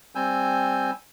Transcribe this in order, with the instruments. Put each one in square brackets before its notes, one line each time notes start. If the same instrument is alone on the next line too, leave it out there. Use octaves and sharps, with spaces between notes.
[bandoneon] G3 C4 G#5 E6 G6